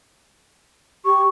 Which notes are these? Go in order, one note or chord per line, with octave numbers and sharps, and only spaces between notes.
G4 C#6